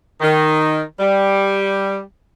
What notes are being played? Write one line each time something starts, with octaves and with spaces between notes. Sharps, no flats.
D#3
G3